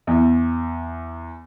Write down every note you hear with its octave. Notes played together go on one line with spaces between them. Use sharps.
E2